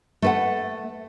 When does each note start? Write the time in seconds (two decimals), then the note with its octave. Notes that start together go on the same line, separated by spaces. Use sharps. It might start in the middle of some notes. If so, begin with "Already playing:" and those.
0.22 A3 B4 F#5